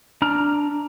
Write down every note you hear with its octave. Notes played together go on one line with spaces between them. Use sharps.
D4 A#5 F6